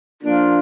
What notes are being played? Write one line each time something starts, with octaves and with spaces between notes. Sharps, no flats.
F3 A#3 D4 F4